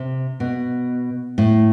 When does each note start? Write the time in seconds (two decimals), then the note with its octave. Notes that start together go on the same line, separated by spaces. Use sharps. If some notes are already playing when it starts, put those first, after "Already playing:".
Already playing: C3
0.40 B2
1.38 A2